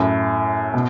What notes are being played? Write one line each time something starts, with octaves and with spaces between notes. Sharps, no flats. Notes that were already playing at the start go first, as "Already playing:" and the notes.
Already playing: F#2 A2
B2